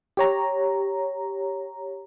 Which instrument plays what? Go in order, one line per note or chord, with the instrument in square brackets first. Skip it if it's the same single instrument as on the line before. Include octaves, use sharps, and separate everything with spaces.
[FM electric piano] G4 C#5 A#5